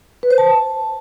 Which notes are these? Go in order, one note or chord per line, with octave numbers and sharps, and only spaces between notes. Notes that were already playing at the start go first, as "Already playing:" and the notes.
B4
C5
A5